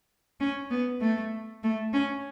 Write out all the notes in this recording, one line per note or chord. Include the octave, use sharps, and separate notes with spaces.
C#4
B3
A3
A3
C#4